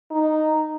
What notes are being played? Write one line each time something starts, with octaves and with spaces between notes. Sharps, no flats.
D#4